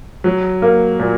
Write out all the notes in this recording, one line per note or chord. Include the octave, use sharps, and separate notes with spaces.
F#3
A#3
A#2